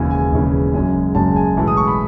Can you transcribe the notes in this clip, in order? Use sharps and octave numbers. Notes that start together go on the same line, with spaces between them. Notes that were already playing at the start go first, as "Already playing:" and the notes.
Already playing: E1 D#2 C#3 E3 G#5
G#5
E1 D#2 C#3 E3
F#1 F#2 C#3 G#3 G#5
F#1 F#2 C#3 G#3 A5
G#5
B1 A2 E3 G#3 A5
D#6
C#6
B5